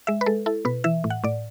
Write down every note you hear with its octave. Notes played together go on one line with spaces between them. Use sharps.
G#3 E5
B4
G#3 A4
E4 A4
B2 B4
E3 E5
A2
F#5
A2 D5